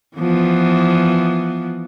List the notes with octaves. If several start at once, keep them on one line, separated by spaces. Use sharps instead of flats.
E3 F3 B3